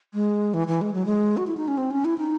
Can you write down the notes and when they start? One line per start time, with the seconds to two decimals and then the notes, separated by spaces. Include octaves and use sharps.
0.14 G#3
0.54 E3
0.68 E3
0.81 G#3
0.94 F#3
1.06 G#3
1.37 F#4
1.47 E4
1.57 D#4
1.68 C#4
1.78 C4
1.91 C#4
2.05 E4
2.18 D#4